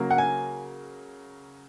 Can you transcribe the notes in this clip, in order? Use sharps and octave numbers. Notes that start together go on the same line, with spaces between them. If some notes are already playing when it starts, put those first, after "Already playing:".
Already playing: C#3 F#3 A#3
F#5
G#5